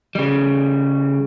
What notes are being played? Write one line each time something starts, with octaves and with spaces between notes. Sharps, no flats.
C#3 G3